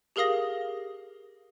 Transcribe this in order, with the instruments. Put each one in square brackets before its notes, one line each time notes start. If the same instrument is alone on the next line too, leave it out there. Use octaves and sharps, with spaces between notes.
[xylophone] G4 G#4 A#4 F5 D#6 A#6